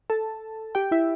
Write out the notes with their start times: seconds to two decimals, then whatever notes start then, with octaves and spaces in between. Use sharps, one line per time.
0.10 A4 A5
0.75 G4 G5
0.91 E4 E5